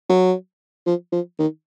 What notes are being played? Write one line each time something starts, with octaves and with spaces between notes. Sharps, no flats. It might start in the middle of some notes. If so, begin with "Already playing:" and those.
F#3
F3
F3
D#3